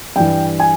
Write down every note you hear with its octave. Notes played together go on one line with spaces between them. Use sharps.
G2 E3 G5
G#5